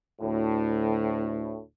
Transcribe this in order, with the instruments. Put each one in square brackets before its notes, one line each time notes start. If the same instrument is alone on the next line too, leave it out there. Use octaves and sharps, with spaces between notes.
[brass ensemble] D2 A2